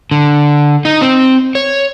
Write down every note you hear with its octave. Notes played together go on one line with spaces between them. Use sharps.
D3
D#4
C4
C#5